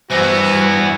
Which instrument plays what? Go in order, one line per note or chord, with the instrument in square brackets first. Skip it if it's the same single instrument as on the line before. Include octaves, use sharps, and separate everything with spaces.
[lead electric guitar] G2 [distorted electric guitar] E3 B3 [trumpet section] F#4 [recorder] C5